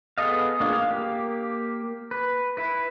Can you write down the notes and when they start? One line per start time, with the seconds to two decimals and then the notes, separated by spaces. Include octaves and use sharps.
0.18 B3 G#4 A4 D#5 F5
0.60 A#3 D4 F4 G#4
0.73 F5
0.91 A#3 G4
2.11 B4
2.57 E4 B4